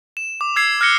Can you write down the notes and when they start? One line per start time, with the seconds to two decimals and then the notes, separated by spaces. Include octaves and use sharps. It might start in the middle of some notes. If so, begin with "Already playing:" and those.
0.17 E7
0.41 D6
0.56 E6 G#6 C7
0.81 F6 F#6 A#6 C#7 G7